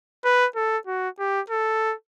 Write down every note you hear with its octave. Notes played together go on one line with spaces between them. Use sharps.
B4
A4
F#4
G4
A4